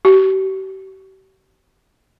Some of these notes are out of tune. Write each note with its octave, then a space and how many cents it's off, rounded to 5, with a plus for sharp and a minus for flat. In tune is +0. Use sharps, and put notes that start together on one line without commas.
G4 -45